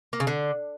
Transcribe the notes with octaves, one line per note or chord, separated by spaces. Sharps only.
A#3
C#3
D3